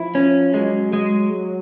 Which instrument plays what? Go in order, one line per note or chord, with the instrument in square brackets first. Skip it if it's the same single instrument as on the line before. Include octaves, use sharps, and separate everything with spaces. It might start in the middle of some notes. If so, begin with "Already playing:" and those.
Already playing: [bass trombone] F3 [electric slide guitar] E4
[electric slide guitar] C#4
[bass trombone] F#3 [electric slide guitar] G#3
[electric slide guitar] G#3